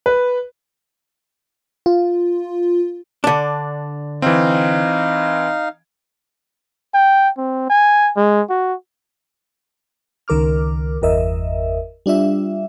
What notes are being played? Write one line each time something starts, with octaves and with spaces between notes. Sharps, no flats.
B4
F4
D3 D4
E3 C4 D#4 F5
G5
C4
G#5
G#3
F#4
C#2 D#3 A#4 D6 F6
G1 E2 A#4 D#5 E5
G3 D4 F4 E5